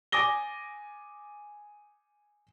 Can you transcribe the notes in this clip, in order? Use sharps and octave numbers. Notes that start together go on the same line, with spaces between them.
G#5 D6 D#6 A#6 G7